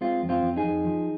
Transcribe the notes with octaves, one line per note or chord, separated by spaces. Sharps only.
G#3 C4 F4
F2
C4 F4
F2
D#4 G#4
F2
F3